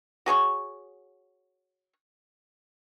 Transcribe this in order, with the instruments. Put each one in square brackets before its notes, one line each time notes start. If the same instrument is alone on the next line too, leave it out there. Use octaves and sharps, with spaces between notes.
[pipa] F#4 G#4 C#5 C#6